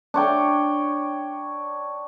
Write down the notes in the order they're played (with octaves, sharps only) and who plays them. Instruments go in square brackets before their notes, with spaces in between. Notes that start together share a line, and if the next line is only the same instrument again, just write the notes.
[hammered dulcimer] D4 C#5 G5